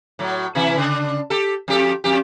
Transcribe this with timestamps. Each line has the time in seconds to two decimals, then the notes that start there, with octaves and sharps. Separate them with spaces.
0.19 A2 F#3
0.55 C3 E3 E4
0.77 C#3 D4
1.30 G4 A4
1.68 F2 G4 A4
2.04 F2 G4